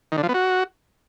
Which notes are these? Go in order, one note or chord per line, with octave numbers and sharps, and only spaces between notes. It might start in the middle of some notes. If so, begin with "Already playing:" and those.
D#3
D3
F3
B3
F#4